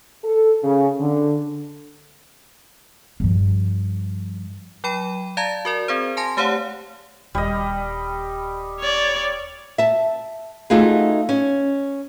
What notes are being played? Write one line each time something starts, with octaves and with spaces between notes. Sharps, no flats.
A4
C#3
D3
G2 F3
F#3 G5 B5 D#7
D5 F5 A5 A#5 G#6 A6
F#4 A#4 D5
C4 G#4 C5
G#5 A5 C6 A#6
A3 G4 C5 C#5 F5 F#5
D#1 G3 D#5
C#5 D5
E5 A5
A3 D#4 F4 F#4 G#4
C#4